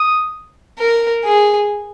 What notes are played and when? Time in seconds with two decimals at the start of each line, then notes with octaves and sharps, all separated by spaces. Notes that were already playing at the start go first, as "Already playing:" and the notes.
Already playing: D#6
0.79 A#4
1.24 G#4